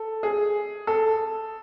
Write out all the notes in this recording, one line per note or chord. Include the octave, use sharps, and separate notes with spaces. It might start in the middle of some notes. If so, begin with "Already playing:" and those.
Already playing: A4
G#4
A4